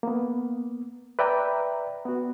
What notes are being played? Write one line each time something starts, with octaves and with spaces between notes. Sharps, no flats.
A#3 B3
B4 D5 E5 G5 A#5
B3 F#4